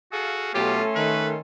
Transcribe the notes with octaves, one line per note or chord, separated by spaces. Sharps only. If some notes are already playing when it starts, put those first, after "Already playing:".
F#4 G#4 A4 F5
B2 F#3 A3 C#4 F4 G4 A4 C6
D#3 B4